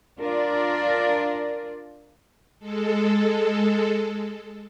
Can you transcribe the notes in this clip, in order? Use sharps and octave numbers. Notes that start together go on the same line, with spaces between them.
D4 F4 A#4 D5
G#3 A4